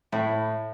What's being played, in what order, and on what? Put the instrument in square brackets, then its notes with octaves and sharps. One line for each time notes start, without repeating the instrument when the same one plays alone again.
[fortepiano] A2 [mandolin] E4